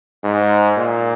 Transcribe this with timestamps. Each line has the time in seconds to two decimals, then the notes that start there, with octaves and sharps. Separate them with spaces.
0.24 G#2
0.77 A#2